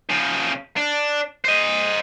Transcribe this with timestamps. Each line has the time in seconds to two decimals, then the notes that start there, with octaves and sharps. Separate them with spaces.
0.10 C#3 F3
0.77 D4
1.45 C5 D#5